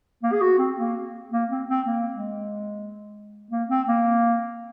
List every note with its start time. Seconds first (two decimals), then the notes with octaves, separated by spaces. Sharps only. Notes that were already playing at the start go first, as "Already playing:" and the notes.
0.23 A#3
0.32 G#4
0.41 F#4
0.58 C4
0.77 A#3
1.32 A#3
1.50 C4
1.68 C4
1.86 A#3
2.14 G#3
3.51 A#3
3.69 C4
3.87 A#3